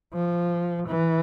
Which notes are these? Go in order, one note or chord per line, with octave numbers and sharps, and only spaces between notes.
F3
E3